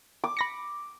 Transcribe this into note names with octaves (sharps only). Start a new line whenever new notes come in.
D6
B5 A#6 C#7